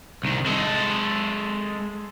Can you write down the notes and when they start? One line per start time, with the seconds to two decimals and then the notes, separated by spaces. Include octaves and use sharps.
0.23 C2 D#3
0.46 G#3 A4